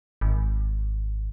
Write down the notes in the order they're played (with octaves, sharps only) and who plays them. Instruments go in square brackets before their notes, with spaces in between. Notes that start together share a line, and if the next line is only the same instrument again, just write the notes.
[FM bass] G#1